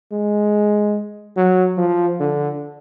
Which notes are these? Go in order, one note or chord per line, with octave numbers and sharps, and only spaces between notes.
G#3
F#3
F3
D3